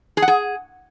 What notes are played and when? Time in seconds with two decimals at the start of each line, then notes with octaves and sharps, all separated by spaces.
0.17 G#4
0.22 F#5
0.28 G#4